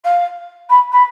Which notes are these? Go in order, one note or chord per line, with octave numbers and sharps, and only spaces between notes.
F5
B5
B5